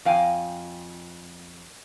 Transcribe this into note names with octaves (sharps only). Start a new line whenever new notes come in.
F2 F5 G5 G#5